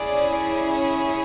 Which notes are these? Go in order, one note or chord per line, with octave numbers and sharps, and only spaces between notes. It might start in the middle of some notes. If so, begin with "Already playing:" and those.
Already playing: C#4 E4 G#4 D5
D5
C#5